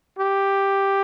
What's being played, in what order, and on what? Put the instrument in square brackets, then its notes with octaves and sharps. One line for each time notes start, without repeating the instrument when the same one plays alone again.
[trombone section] G4